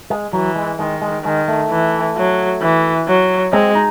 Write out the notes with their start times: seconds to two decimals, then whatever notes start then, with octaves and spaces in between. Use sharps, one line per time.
0.10 G#3
0.33 E3 F#3
0.56 G#3
0.79 D#3 G#3
1.02 G#3
1.24 D#3 G#3
1.48 A3
1.70 E3
2.16 F#3
2.61 E3
3.08 F#3
3.52 G#3 C4
3.75 D#4